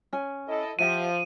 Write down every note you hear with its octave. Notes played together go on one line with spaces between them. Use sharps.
C#4 G#5
E4 A4 D#5
F3 G4 E5 F#5 D#7